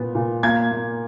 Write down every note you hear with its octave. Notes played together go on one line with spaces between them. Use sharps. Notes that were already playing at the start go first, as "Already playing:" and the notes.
Already playing: A#2 B3
A#2
A#3 G#6
A#3